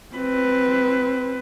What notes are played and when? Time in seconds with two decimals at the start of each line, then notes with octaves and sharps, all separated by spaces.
0.15 C4 B4